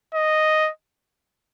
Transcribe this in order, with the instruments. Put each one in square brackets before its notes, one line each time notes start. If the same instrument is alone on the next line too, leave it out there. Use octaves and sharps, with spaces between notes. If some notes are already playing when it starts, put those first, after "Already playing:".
[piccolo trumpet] D#5